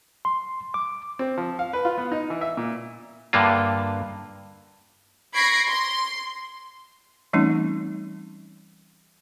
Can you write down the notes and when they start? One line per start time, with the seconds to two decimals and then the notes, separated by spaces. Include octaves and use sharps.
0.25 C6
0.74 D6
1.19 C4
1.38 F3
1.59 F5
1.73 B4
1.85 F4
1.98 B3
2.12 D#4
2.30 E3
2.41 E5
2.57 A#2
3.33 G2 D3 A#3 F4
5.35 B5 C#6 G#6 A#6 C7 D7
5.68 C6
7.33 E3 G3 A3 C4 C#4 D#4